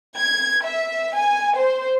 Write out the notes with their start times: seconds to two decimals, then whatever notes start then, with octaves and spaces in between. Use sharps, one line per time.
0.18 G#6
0.66 E5
1.16 G#5
1.57 C5